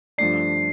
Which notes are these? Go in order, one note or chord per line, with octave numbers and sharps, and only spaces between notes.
G2 F3 A3 D4 C7